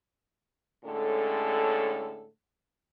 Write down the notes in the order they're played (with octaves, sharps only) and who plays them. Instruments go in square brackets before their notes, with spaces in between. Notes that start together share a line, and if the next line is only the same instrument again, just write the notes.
[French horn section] A2 D3 G#3 C#4 A4